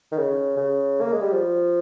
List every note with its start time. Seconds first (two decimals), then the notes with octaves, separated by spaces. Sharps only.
0.11 D#3
0.18 C#3
0.57 C#3
1.01 A#3
1.12 G#3
1.22 G3
1.32 F3